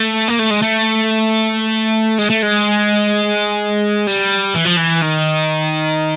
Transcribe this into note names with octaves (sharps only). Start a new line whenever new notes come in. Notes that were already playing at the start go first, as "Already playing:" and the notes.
Already playing: A3
A#3
A3
G#3
A3
G#3
A3
G#3
G3
E3
F3
E3
D#3